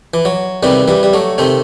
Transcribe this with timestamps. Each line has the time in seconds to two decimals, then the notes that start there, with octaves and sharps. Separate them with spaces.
0.14 E3
0.25 F#3
0.63 E2 C3 D#3 E3 G3
0.88 E3 G3
1.03 G3
1.13 F#3 A3
1.38 C3 D#3 A3 C4